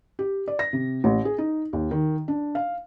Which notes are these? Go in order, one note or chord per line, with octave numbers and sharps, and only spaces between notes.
G4
D5
A#6
C3
A1
G#4
D#4
D#2
D#3
D4
F5